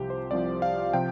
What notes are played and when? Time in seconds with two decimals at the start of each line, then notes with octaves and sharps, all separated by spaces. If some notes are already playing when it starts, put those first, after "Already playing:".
Already playing: C2 C3 F3 G4
0.10 C5
0.31 C2 C3 F3 D5
0.62 F5
0.93 C3 F3 G5